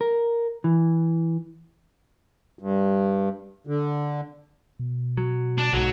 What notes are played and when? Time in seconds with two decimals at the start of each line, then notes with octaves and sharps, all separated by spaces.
0.01 A#4
0.64 E3
2.59 G2
3.67 D3
4.79 B2
5.17 F#3
5.58 D4
5.73 B1 G#2 F#3